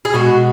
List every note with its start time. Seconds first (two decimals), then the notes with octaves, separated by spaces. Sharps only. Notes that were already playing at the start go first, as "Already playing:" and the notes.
0.05 G#4
0.13 B2 G#3 F#4